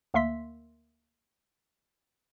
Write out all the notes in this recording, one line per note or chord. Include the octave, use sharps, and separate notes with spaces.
D2 A#3 A#4 E5 C6 B6